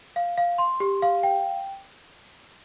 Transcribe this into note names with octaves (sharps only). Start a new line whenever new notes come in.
F5
F5
C6
G4
F5
G5